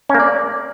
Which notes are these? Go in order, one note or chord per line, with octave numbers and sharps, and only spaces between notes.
C#4
A#3
D5